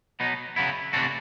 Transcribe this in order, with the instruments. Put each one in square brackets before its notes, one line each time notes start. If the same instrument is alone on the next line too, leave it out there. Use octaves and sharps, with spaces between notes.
[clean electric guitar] B2 F#3 B3 D#4
C#3 F#3 B3 E4
C3 E3 A3 D4 F#4